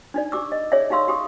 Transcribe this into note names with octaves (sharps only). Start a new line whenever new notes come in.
D4 D#4 D5
G4 D6 E6
D#5
G#4 C#5 D5 E5
D#4 G4 F5 C6 E6
G4 C6 D#6